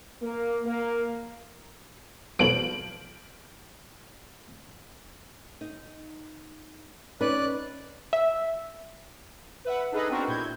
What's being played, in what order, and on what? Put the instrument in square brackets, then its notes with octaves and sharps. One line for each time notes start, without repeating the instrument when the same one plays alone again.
[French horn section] A#3
A#3
[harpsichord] B1 F3 [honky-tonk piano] D7 F#7
[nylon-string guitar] D#4
[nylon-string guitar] C#4 D#4 B4 [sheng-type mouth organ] D5 F#6
[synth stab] E5
[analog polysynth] B4 E5 F#5
D4 D#4 G#4 A4 B4 D#5
B3 C4 D4 F#4 A#4
A#2 E4 G6 G#6